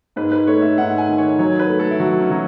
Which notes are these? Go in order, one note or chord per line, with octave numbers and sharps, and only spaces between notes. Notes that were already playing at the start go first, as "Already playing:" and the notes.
G#2 B4
B4
A3 C#5
E5
G#2 F#5
G#5
D#3
C#5
F#3 C#5
B4
A3
A4
E4
F#3 F#4
C#4
F#3